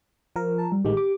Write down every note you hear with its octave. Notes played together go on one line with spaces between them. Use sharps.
F3 A#4
A5
G3
A1 D#3 G#3 G4
D6